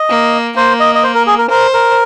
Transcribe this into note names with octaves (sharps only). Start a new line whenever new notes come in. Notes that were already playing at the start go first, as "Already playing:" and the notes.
Already playing: D#5
A#3
A#3 C5
D#5
D#5
C5
A#4
G#4
A#4
A#4 C5
A#4